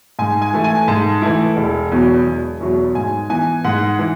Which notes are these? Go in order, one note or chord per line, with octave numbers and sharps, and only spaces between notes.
G#2 G#5
G#5
E3 A3 E4
G#5
G#2 A5
E3 A3 E4
E1
E2 B2 F#3
E1
E2 B2 F#3
G#2 G#5
E3 B3 G#5
G#2 F#5
E3